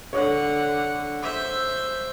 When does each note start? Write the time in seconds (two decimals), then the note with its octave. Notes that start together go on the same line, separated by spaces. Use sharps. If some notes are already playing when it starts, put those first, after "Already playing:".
0.13 D3 C#5 F#5
1.23 C5 E5